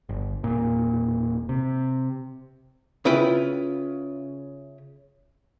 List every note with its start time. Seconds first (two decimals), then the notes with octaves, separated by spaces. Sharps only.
0.09 G1
0.43 E1 A#2
1.49 C3
3.05 C#3 E4 F4 B4 G5